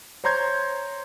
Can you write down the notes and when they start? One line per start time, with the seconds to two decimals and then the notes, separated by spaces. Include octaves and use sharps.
0.24 C5 C#5 A#5 C6 G6 G#6